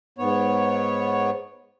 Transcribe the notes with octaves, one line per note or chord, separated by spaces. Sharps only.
G#2 B3 C#5